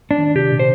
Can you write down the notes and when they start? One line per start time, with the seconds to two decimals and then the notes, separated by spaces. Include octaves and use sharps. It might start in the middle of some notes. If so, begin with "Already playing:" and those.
0.11 D4
0.18 D#3
0.35 C3 G4
0.51 A#2
0.59 C5